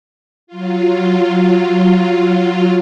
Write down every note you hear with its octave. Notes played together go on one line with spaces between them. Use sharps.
F#3 F4